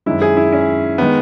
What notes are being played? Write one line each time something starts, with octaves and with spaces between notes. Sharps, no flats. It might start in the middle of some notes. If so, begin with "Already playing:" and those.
F#2 D#3 G#3 E4
G#4
E4
C#4
D#3 G#3 B3